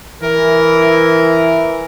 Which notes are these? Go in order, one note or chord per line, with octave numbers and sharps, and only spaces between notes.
E3 A#4